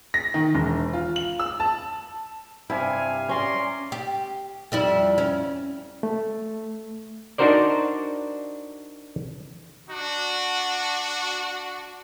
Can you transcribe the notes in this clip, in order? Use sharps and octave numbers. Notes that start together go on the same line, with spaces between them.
A#6
D#3
E1
F4
F#7
E6
A5
G2 C3 E4 F5 G#5
C#4 D5 A#5 C6
G4
F2 G3 E4
C#4
A3
D4 D#4 F#4 A#4 C5 D5
D4 F#4